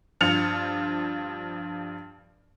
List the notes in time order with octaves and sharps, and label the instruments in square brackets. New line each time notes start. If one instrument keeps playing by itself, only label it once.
[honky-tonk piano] G2 F3 F6 C#7 F7